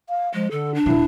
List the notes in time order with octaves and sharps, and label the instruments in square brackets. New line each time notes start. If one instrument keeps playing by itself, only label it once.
[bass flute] F5
[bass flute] F3 [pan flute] G#3
[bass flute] D3 [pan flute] A4
[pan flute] D4
[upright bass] D#1 A#2 [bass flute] E4